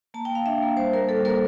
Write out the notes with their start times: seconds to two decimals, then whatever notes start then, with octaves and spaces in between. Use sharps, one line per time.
0.14 A#3 A5
0.25 G5
0.30 A#3
0.35 F5
0.46 D4 E5
0.62 A#3
0.77 G3 C5
0.93 A#3 A#4
1.09 G3 A4
1.25 A#3 A#4